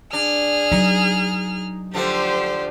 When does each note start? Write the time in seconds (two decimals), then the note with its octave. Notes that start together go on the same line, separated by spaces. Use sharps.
0.13 D4 G#4 F6
0.72 F#3 D#4
1.94 D3 F3 A3 G4 C5